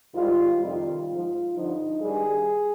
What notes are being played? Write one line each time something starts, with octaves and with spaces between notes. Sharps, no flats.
G#2 D#3 G3 F4
F2 C3 D#3 G3 F4
G#2 F3
G2 D3 F3 D#4
G2 D#3 G3 G#4